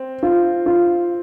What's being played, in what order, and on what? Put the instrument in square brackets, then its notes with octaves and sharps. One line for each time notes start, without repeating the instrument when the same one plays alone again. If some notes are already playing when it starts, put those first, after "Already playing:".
Already playing: [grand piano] C4
[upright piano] F4
F4